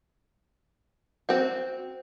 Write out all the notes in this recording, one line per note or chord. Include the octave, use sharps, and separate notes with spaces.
C4 F#4